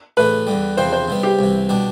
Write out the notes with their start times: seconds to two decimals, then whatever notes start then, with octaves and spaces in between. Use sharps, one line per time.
0.17 A2 E3 A3 B4
0.47 E2 D3 G3
0.77 E2 C3 F3 C4 C5
0.93 C5
1.08 C3 G3 B3
1.23 G4
1.39 C2 C3 E3
1.69 B2 G3 D4